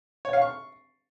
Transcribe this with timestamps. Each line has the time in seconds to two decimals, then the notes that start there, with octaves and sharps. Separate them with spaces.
0.25 C#5
0.33 F5
0.42 C#6